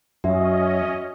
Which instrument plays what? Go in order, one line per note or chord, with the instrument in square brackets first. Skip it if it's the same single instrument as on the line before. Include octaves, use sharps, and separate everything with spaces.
[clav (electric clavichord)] F#2 [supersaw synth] C#4 D#5 [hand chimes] F#4 E5